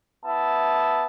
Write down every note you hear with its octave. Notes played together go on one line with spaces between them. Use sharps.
B3 E4 A5